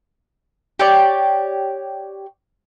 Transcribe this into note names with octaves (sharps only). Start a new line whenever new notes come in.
G4 C#5 D5